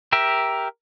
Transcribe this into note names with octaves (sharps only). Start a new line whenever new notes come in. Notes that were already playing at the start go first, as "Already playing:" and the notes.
G4 A#4 E5